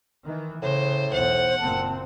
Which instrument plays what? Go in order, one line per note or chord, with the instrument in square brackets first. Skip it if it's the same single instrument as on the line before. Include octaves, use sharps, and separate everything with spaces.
[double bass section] D#3 E3
[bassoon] A2 [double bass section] C#3 [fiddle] C5
[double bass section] B1 E2 [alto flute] C5 [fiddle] F#5
[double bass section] F#1 A#2 C4 [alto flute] A5